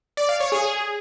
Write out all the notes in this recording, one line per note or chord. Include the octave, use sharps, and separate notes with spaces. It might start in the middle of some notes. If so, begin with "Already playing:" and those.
D5
F5
C#5
G#4